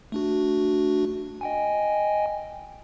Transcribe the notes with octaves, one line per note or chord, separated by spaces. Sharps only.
A3 D4 F#4
D#5 G5 G#5